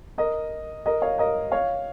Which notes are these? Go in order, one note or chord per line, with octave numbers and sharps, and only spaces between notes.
A#4 D#5
A#4 D#5
C#5 F5
A#4 D#5
C#5 F5